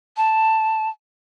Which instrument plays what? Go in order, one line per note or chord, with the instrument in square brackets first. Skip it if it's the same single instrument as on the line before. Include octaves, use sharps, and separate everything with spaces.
[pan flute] A5